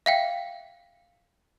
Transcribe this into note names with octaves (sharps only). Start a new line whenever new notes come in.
E5 F5 G5